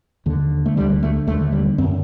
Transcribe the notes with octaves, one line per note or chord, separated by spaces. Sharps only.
D#2 D3
A3
D2 D3 G3
A3
D#2 D3 A3
G3
F#2 D3 C4